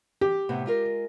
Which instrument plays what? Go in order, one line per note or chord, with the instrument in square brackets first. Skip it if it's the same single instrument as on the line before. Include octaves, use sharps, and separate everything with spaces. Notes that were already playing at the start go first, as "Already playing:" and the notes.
[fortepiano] G4
[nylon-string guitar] A2 C3 B3
G#3 F4 A#4